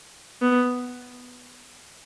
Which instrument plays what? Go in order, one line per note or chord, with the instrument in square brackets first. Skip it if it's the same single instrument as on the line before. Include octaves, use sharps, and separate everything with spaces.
[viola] B3